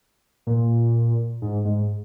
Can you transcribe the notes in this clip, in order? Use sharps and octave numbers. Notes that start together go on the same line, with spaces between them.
A#2
G#2
G#2